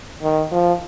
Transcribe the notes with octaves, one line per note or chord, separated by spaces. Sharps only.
D#3
F3